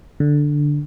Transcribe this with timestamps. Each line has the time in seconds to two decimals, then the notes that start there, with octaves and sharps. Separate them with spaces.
0.20 D3